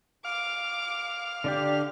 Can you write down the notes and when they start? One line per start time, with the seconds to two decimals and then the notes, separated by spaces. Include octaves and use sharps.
0.25 F5 D6
1.44 D3 D4 G4 D5